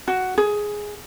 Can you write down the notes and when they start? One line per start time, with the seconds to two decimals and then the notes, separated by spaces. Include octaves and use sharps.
0.08 F#4
0.38 G#4